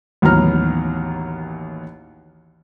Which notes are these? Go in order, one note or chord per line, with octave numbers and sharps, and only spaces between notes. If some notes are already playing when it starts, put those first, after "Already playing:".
A1 D#2 F#3 B3 A#5 F6